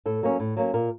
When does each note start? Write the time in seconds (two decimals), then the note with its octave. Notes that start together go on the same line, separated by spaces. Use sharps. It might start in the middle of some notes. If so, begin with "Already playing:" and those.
0.06 A2 A4
0.23 F#3 A#3 C#4
0.40 A2
0.57 F#3 A#3 C#4
0.74 A#2 A#4